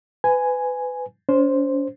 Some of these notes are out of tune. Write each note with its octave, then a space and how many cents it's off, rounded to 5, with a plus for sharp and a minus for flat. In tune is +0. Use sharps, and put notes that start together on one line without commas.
B4 +25 G#5 +0
C#4 +40 C5 +0